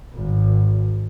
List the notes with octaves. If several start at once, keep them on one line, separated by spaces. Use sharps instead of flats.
G#1